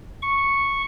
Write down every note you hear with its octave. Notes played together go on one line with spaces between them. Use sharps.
C#6